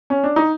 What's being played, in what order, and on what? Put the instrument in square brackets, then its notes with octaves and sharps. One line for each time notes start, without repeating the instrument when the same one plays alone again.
[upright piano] C#4
D4
D#4